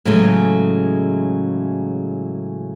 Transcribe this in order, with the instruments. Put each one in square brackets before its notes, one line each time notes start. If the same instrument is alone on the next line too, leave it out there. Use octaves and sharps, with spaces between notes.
[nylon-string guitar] A2 C#3 E3 F#3 G#3 A3